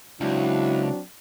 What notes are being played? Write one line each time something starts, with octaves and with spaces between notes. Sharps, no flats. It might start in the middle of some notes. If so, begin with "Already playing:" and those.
C#2 F#3 C4 D4 E4